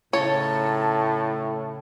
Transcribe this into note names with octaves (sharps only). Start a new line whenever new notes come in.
A2 C#3 D#4 C#5 D#5 A5